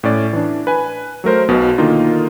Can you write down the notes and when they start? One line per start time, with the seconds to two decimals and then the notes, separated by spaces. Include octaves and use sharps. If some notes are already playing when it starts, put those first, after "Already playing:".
0.04 A2 C#4 D5
0.33 E3 D4
0.67 B4 G#5
1.24 F#3 A3 A#4 C5
1.49 B1 B2
1.78 D3 D#3 A#3 D#4 F4